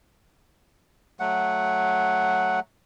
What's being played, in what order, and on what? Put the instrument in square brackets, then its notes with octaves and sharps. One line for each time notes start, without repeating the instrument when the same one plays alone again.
[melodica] F#3 A3 F#5